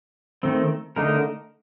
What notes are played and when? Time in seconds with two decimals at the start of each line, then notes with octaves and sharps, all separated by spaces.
0.43 D#3 A3 C4
0.96 D3 A3 D#4 A#4